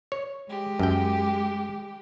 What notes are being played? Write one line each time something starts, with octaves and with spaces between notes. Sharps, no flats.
C#5
G#3 G4
F#2 G5